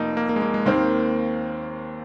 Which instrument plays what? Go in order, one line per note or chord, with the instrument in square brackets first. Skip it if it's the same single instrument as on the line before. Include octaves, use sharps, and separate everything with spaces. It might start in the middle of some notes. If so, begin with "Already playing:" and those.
Already playing: [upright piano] F1 [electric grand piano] A#3 D#4
[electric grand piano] A#3
A#3
G#3
A#3
G#3
[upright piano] D#2 D#3 C4 [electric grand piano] A#3